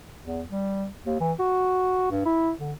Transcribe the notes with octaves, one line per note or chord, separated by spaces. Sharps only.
E2
G3
D#2
E3
F#4
G2
E4
D3